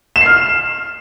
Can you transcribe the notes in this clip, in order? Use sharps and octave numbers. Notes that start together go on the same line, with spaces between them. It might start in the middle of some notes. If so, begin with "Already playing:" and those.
E7
C7
F6